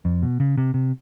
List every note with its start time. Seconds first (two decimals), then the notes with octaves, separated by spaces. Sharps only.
0.05 F2
0.23 B2
0.40 C#3
0.57 C3
0.74 C3